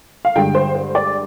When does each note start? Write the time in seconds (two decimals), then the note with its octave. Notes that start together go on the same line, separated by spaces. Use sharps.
0.25 F5
0.36 G2 D3 G#3 G5
0.55 C5
0.75 C5
0.95 D5